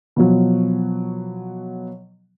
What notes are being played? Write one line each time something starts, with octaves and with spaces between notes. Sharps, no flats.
B2 F3 F#3